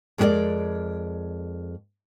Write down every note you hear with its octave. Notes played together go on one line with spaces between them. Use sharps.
F2 G#3 B3 G4 A#4 D5